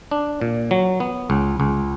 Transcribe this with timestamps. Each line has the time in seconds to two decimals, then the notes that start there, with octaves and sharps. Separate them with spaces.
0.11 D4
0.41 A#2
0.71 F#3
1.00 B3
1.30 C#2
1.60 C#2